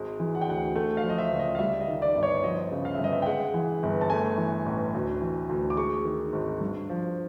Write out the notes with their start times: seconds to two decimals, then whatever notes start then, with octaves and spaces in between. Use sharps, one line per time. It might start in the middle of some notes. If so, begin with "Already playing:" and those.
Already playing: G#1 G#3
0.20 E3
0.35 F#5
0.41 G5
0.48 D2 F#5
0.76 A3
0.97 F5
1.03 F3
1.10 D#5
1.18 E5
1.32 C#2
1.39 D#5
1.55 F5
1.59 G3 E5
1.81 D#5
1.87 D#3
2.02 D5
2.15 G1
2.23 C#5
2.43 F3 D#5
2.72 C#3
2.85 F5
2.94 G1 E5
3.04 D#5
3.13 E5
3.22 G5
3.26 G#3 F#5
3.54 E3
3.83 G1
4.01 A5
4.10 A3 G#5
4.38 E3
4.66 A1
4.94 D2
5.22 E3
5.49 D2
5.70 D6
5.77 G#3 C#6
6.05 D#3
6.33 G#1
6.61 G2
6.89 F3